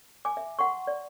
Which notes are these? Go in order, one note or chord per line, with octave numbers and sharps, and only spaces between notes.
G#5 D6
E5
F#5 C6 C#6
D5